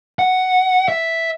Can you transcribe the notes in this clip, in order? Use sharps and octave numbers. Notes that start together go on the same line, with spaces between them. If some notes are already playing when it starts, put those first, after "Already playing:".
F#5
E5